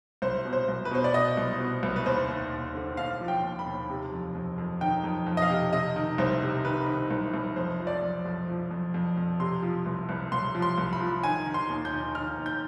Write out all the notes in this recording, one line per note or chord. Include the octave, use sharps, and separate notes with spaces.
C2 C5
B2
C5
C2
B4
B2 C5
D5
B2 D#5
C2
B2
C2
B4
D#2 C5
D#2
D#2
D3
D#2 F5
F3
G5
D#2
B5
D#2
C3
F2
F2
F2
D#3 G5
F2
F2
D#5
F5
C3
C3 D#5
D#3
C2 C5
C3
D#3 B4
D#3
C2
C2
F2 C5
F3
D5
F2
F2
F3
F2
F2
F2
C3 C6
F3
C2
C2
C2 C6
F3
C6
C2
B5
F3
D#3 G#5
D#3
C6
D#2
G6
D#3
D#3 F6
D#2
G6